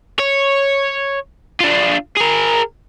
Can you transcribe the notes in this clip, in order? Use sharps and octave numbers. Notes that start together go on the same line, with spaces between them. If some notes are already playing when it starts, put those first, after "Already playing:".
C#5
D4 F4
G#4 A#4